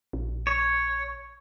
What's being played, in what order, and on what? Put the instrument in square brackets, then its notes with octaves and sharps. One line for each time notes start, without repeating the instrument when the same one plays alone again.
[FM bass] A#1
[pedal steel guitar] C#5